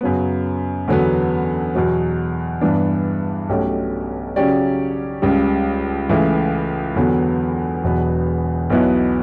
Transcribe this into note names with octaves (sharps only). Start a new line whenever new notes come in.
F#2 C#3 F#3 B3
E2 D3 F#3 B3
E2 B2 F#3
G2 E3 B3 D4
B1 B2 A3 C#4 G4
C#3 F#3 C#4 G4 D5
C#2 C#3 G3
C#2 C#3 E3 A3 E4
E2 D3 F#3 B3
E1 E2 B2 F#3 B3
B1 B2 F#3 B3 E4